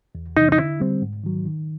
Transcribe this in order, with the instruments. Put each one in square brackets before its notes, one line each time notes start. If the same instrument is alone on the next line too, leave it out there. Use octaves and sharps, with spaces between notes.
[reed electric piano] E2
[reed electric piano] C3 E3 [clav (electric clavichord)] D#4
[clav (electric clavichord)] D#4
[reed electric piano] D3 [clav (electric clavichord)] E4
[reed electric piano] G3 C4
G#2
D#3 F#3
D#3